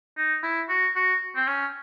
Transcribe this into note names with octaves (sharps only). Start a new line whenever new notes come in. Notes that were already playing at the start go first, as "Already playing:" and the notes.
D#4
E4
F#4
F#4
C4
C#4